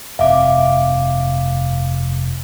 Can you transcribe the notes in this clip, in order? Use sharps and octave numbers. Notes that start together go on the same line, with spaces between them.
F1 G2 C4 E5 F5 D6